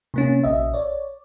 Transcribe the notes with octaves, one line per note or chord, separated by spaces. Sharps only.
C3 A#3 C#4
A#1 D#5 E5
C#5 D5